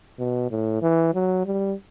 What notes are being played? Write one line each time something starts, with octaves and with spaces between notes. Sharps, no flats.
B2
A2
E3
F#3
G3